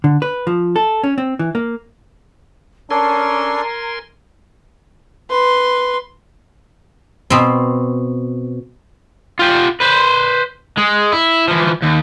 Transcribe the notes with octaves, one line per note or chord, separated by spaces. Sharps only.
D3
B4
F3
A4
C#4
C4
E3
A#3
C#4 D4 A4 A#4 G#5 A#5 C6
B4 C6
B2 C4
F4 G4
B4 C5
G#3
E4
E3 F3
D#2